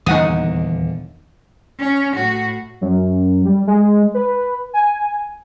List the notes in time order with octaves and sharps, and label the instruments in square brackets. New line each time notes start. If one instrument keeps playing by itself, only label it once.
[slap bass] D#1 E2 D3 [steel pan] D#4 F#5 D#6
[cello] C#4
A2 F#4
[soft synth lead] F#2
G3
G#3
B4
G#5